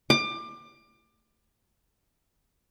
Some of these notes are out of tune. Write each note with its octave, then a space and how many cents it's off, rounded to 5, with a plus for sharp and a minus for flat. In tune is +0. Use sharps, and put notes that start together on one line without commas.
D6 +25